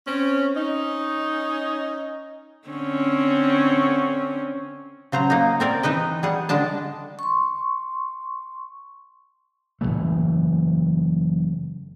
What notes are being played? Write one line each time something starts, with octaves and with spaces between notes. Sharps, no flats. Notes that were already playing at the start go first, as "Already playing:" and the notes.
C4 C#4
C#4 D#4
D3 C4 C#4
C#3 F#3 C5 A#5
A#3 D#4
C4 A#4 D5
E3 D#4 B4 D#5
G3 G#4 F#5
D3 G#3 D4 A5
C6 C#6
F#1 F2 E3 A3